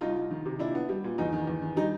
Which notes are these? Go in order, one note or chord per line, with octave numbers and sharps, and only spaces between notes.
C2 D#4 F4
C2
D#3
C3
A#2 D4 E4
B3
G3
A#2
E2 D#4
D#3
E2
D#3
G3 D#4